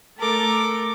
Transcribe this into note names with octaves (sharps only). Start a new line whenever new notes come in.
A3 A4 A#4 D6